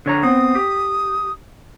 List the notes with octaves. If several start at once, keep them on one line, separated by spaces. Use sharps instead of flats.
D3 C#5 A#5
B3 C4 D#6
G4